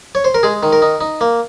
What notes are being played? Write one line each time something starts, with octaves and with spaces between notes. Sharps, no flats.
C#5
C5
A#4
G#3 G#4
D#3
A#4
D#4
D#4
A#3